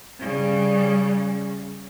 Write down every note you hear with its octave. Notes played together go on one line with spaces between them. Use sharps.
C#3 G3